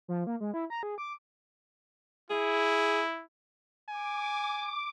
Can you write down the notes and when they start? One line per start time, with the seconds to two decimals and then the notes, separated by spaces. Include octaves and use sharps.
0.08 F3
0.27 A#3
0.40 G#3
0.54 E4
0.70 A#5
0.83 G#4
0.98 D6
2.30 E4 G#4
3.89 G#5 D6